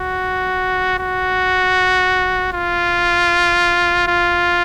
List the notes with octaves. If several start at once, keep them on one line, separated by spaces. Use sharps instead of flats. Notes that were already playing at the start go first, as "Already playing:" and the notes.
Already playing: F#4
F#4
F4
F4